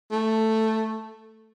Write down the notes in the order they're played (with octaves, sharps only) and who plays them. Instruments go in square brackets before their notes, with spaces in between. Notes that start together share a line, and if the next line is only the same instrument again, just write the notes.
[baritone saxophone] A3